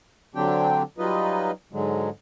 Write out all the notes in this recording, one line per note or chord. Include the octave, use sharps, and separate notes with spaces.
D3 F#3 C4 D4 G4 G5
F#3 G3 D#4 F4 B4 D#5
G#2 D3 F#3 G#3